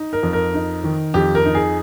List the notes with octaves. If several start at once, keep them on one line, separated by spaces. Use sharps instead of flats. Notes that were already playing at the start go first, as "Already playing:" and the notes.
Already playing: D#4
A#4
F2
A#4
D#4
D#3
F2 G4
A#4
D#4
G#4